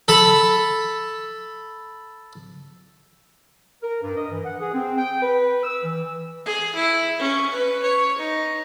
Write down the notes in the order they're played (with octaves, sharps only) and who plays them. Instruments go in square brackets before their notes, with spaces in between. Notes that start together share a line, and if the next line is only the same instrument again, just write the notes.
[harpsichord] A4 B5
[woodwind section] A#4
G2
D#5
E3
F#5
G#4
C4
G5
B4
E6
E3
[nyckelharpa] G#4
E4
C#4
B4
C#5
D#4